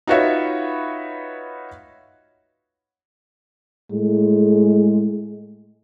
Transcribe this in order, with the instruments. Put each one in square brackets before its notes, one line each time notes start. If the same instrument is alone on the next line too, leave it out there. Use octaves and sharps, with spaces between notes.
[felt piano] D#4 F4 F#4 B4 C#5 E5
[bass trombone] A2 [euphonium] G#3